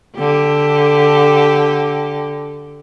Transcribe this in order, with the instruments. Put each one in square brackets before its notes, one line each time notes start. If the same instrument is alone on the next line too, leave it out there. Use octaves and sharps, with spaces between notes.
[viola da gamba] D3 G4